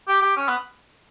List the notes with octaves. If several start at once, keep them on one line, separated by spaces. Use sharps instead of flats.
G4
G4
C#4
B3